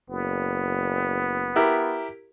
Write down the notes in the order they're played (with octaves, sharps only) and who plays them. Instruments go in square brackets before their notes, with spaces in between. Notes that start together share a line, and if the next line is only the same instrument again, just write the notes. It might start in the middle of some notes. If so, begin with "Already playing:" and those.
[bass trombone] F#1 [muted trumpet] B3
[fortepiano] E4 G4 A#4